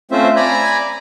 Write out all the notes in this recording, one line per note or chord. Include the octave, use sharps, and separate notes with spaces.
A3 C4 C#4 F4 C5 E5
D5 G#5 A#5 B5